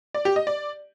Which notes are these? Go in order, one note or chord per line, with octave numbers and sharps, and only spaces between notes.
D5
G4
D#5
D5